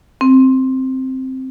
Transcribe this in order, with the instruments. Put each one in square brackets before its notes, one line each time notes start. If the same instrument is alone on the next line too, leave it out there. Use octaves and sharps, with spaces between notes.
[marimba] C4